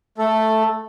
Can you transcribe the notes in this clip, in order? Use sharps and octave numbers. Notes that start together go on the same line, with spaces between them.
A3 A4